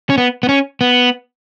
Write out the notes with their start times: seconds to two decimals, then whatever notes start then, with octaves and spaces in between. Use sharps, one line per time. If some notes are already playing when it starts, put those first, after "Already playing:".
0.10 C#4
0.18 B3
0.43 B3
0.49 C#4
0.81 B3